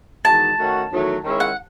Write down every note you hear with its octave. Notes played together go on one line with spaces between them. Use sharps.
E2 D#3 G#3 D#4 F#4 A5
D#3 A3 C#4 F#4
E2 D#3 F#3 A3
D#3 G#3 C#4 E4
F#5